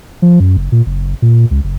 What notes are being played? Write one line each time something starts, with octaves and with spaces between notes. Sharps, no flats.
F3
F#2
F#1
A#2
F#1
A#2
C#2
F#1